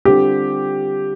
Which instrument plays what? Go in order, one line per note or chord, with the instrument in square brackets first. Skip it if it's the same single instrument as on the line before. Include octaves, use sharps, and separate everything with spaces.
[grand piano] D3 G3 C4 F4 [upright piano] G4